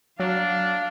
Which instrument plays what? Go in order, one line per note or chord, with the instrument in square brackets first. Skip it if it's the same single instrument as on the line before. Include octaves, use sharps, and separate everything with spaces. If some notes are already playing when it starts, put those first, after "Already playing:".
[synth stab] F#3 [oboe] D4 [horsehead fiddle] F5